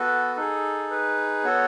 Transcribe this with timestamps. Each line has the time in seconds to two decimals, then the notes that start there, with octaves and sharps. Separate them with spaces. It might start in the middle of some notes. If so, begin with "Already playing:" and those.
Already playing: B3 F#4 A4 B4
0.36 D#4 G#4 A4
0.90 B4
1.44 B3 F#4 A4 C#5